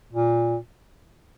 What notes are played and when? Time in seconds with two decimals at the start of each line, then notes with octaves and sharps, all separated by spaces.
0.13 A#2